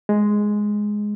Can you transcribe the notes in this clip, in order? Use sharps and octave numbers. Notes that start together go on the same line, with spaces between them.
G#3